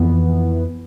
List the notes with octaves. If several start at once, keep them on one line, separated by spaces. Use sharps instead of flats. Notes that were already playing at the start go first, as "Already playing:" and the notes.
Already playing: F2 E3 B3